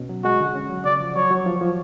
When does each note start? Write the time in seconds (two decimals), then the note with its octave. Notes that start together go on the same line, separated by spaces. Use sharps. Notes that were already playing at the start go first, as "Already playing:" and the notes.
Already playing: B2 C#4
0.09 F#3
0.24 G#3 F#4
0.40 D3
0.55 C#4
0.70 F#3
0.85 C#3 D5
1.00 F3
1.16 F#3 C#5
1.31 F#3
1.46 F3
1.61 F3